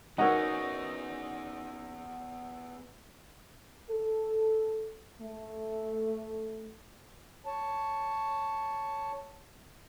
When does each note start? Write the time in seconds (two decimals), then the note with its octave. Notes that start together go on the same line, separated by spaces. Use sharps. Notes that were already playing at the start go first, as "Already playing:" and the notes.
0.18 B3 C#4 D#4 F#4 G#4 A#4 F#5
3.90 A4
5.21 A3
7.46 C#5 A5